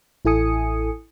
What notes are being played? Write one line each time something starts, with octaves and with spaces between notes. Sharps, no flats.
A1 E4 A4 G#5 D#6 C#7